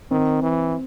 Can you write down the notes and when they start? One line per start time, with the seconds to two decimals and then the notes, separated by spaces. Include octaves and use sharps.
0.11 D#3 C4
0.43 E3